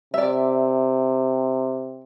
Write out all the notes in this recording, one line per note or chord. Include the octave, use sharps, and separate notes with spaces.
C3 D5 E5